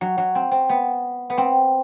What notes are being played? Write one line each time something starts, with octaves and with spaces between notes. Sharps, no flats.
F#3
F#3
C4
C4
B3
B3
C4